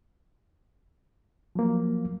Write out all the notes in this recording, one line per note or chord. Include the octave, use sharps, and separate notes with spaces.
F3 F#3 A#3